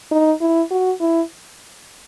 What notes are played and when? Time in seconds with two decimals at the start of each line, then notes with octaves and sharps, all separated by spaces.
0.11 D#4
0.41 E4
0.70 F#4
1.00 E4